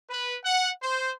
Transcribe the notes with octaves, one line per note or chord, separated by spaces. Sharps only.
B4
F#5
C5